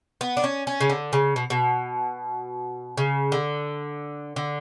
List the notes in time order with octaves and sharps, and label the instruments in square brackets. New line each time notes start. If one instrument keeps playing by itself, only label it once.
[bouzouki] B3
D4
C#4
C#4
C#3
D3
C#3
B2
B2
C#3
D3
D3